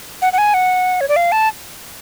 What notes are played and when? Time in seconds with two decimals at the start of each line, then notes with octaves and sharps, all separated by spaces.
0.22 F#5
0.33 F#5
0.38 G#5
0.54 F#5
1.01 C#5
1.08 D5
1.16 F5
1.32 A5